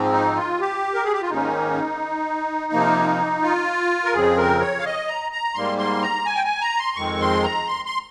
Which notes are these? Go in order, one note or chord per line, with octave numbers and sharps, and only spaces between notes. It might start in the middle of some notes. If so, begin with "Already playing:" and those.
Already playing: G#2 F3 C4
D#4
F4
G4
A#4
G#4
G4
F4
G#2 D#3 A#3 C#4 D#4
C3 F3 A#3
F4
A#4
F2 C#3 F3 C4 G#4
A#4
C#5
F5
D#5
A#5
A#5
G#2 G3 A#3 C6
C6
A#5
G#5
G5
G#5
A#5
C6
F2 D#3 G#3 C4 C#6
C6
A#5
C6
C6